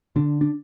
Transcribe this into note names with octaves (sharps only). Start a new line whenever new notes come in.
D3 D4
D4